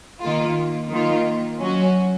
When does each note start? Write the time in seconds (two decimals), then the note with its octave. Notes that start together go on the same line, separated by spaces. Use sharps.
0.21 D#3 A#3 F4
0.91 D#3 A#3 F4
1.61 F#3 C#4 F#4